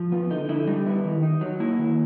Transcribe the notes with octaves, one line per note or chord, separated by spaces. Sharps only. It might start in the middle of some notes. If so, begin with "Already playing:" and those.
Already playing: F3
B3 F4
D3 D#4
D3 E4
G3 D#4
B3 E4
D#3
D#4
F#3
A#3 E4
D#3